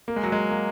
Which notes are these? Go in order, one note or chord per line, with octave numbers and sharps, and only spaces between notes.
A#3
G#3
F#3
G#3
A#3